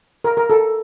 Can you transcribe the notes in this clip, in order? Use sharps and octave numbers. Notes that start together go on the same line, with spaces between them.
A#4
A#4
A4